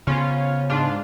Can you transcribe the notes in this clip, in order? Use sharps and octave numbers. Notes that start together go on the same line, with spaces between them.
C#3 B3 C#4 F4
G#2 D4 F4